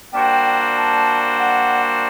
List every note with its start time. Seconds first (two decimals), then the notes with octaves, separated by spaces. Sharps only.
0.13 G3 A#3 D4 F#4 C5 G5
0.76 A5
1.38 F#5